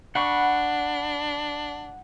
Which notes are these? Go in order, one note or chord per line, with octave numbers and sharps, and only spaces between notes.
D4 F#5 B5 C#6